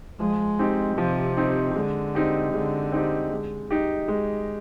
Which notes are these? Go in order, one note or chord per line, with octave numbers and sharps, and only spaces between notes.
F3 G#3
C4 D#4 G4
C3 F3
C4 D#4 G4
D3 G#3
C4 D#4 G4
D3 G#3
C4 D#4 G4
G#3
D#4 G4
G#3